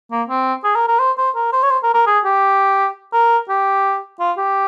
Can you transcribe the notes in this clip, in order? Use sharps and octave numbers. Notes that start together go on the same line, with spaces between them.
A#3
C4
G#4
A#4
A#4
C5
C5
A#4
C5
C#5
C5
A#4
A#4
G#4
G4
A#4
G4
F4
G4